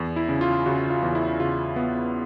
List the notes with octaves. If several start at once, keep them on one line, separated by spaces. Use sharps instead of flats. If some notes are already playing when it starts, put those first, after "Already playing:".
Already playing: E2
E4
C#3
F4
C#3 F#4
F4
E2
E4
C#3 F4
B3